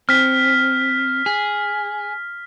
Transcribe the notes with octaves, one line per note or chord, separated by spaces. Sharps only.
C4 F6 B6
G#4